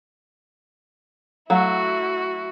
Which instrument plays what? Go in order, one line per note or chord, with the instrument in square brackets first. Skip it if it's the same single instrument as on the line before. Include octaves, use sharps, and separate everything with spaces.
[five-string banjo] F#3 A3 [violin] E4 F#4 [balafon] F5 F#5